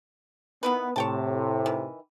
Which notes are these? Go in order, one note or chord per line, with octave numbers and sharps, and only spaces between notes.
D#3 B3 E4 B4
A2 C3 C#5 G5 A5
D#3 E3